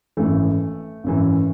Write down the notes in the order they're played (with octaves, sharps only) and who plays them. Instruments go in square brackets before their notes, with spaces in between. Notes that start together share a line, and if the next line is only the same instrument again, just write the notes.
[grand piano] G#1 F#2 E3 A3
G#1 F#2 E3